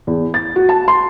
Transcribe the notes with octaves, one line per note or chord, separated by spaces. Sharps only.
E2
A6
F#4
A5
C6